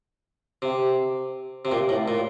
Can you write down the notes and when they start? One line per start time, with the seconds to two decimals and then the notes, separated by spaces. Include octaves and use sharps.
0.62 C3
1.65 C3
1.72 A#2
1.89 A2
2.08 A#2